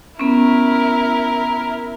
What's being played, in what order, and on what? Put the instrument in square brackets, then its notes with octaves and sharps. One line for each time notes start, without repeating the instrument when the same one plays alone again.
[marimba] B3 C#4 [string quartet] E4 A#4